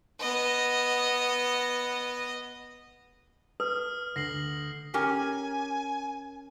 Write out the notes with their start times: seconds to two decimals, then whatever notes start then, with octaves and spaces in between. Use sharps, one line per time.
0.21 B3 D#5
3.60 B4 D#6 F6
4.16 D2 A#6 C7 F#7
4.94 C#4 G4 A#4 G#5